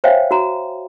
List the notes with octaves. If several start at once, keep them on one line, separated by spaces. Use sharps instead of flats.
C5 C#5 E5 F5 G5 G#5
F#4 A#5